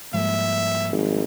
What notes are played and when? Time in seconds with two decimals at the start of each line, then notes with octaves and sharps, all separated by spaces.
0.14 G#2 F3 G3 A#3 E5
0.92 G#1